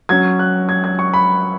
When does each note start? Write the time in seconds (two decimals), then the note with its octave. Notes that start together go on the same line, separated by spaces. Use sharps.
0.09 F#3 C#4 G#6
0.39 F#6
0.69 G#6
0.84 G#6
0.99 C#6
1.14 B5